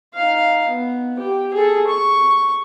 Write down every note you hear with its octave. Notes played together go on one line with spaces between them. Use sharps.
D#4 F5
B3
G4
G#4 A4
C#6